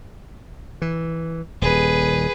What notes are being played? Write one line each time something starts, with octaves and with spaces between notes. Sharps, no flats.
E3
D#1 G#4 B4